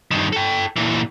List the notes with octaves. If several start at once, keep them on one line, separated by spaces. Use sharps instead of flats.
G2 D#3
A4 G5
A#2 E3